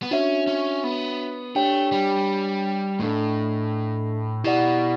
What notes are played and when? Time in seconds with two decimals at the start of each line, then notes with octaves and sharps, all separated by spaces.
0.03 B3
0.11 C#4 D4 F#4 C#5 E5
0.47 C#4
0.84 B3
1.55 A3 D4 G4 C#5 G5
1.92 G3
2.99 A2 A3 D4 A4
4.44 B2 E4 G4 D5 F#5